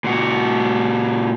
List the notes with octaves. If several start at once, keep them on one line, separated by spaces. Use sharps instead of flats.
A#2 F#4